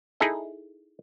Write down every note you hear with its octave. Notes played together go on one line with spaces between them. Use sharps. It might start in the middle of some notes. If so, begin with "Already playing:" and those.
D#4 E4 G#4 A4 D#5